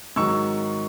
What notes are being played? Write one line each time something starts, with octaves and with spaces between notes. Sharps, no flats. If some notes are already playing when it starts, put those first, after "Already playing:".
G#2 D#3 F#3 C#6 E6